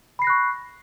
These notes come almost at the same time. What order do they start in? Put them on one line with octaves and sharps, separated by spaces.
B5 C7 A#6 F#6 C#6